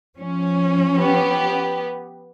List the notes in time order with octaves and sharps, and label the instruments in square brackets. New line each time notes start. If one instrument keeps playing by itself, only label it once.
[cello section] F3 C#4
[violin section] B3 G4